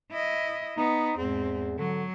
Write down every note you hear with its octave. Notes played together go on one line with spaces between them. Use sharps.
E4 D#5
B3 D#4
E2 G#2 C4
D3 F#3